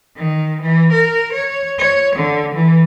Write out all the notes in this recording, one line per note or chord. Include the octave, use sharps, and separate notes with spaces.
D#3
E3
A#4
C#5
C#5
D3
E3